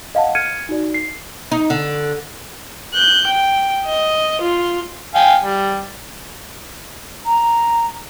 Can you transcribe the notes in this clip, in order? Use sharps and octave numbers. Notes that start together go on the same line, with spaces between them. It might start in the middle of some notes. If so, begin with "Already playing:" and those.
D#5 F5 F#5 A5
F6 G#6 C#7 D#7
D#4 F#4 D5
C7
D#4
D3
F#6 G6
G5
D#5
F4
F5 G5 G#5
G3
A#5